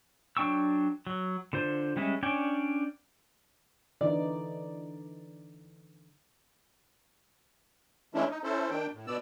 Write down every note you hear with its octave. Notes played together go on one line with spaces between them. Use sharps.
F#3 D4 G5 C#6 E6
F#3
D3 F4 C5
G3 G#3 C#4 E5
C#4 D4 D5 G5 G#5
D3 E3 D#4 D5
E3 G#3 A3 C#4 D4 E4
D#4
C#4 E4 A4 C5
D#3 D4 G5
A2
B2 B3 D5 E6